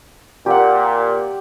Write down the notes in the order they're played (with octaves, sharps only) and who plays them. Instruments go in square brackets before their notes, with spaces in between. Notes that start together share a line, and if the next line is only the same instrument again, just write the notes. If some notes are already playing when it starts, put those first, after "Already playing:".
[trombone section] A#2 [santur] G4 F#5